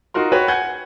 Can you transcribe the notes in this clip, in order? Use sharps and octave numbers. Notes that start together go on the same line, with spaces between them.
D#4 F4 F#4 A#4 C6
F#4 B4 C#5 G5
F#5 G#5 G6 G#6